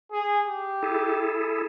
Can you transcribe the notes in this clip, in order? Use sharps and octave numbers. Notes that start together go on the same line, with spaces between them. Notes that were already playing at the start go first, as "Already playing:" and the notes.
G#4
G4
E4 G#4 A4